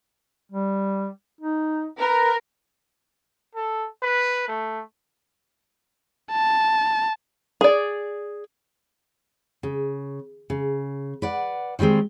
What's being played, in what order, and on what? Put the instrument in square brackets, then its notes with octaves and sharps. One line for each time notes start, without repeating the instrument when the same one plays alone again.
[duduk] G3
D#4
[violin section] A#4 [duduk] B4
[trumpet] A4
B4
A3
[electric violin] A5
[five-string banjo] G#4 D5
[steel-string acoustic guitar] C#3
C#3
B4 D5 F#5
D#3 E3 G3 G#3 C4